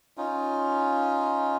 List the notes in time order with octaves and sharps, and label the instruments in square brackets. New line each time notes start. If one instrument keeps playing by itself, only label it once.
[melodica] C#4 D#4 F4